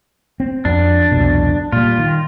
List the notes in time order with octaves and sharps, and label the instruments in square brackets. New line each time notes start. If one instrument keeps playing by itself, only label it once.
[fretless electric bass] C4
[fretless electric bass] F2 [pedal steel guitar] D4
[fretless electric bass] C2 F2 B2
[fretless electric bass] A#2 G3 [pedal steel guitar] F4
[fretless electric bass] D#3